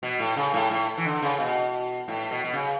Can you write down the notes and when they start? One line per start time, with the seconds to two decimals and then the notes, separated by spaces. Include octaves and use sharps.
0.03 B2
0.19 A2
0.36 C#3
0.54 A2
0.71 A2
0.97 E3
1.05 D3
1.22 C#3
1.40 B2
2.08 A2
2.31 B2
2.44 B2
2.53 C#3